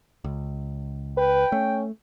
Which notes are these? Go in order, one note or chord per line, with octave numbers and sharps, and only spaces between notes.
C#2
B4 G5
A3 C#4